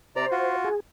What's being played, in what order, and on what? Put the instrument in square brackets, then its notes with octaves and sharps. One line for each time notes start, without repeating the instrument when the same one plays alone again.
[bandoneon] C3 D5 A#5 [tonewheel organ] C5
[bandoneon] F4 F#4
[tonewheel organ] G#4